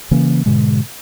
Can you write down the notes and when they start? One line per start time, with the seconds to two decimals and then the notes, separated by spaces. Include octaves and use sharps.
0.11 C#3 E3 A#3 C#4
0.46 G#2 B2 D3 G#3